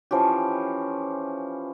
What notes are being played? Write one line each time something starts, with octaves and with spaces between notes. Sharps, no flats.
E3 F3 C#4 G4